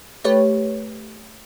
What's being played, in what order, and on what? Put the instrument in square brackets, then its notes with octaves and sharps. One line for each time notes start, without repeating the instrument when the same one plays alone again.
[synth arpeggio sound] A3 G4 B4 C#5